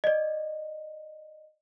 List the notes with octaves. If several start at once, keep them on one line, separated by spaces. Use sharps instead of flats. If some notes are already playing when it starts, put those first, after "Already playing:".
D5 D#5